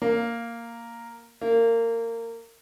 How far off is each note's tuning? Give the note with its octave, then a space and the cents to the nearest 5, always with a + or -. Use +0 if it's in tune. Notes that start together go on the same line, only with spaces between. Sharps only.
A#3 -5
A#3 -25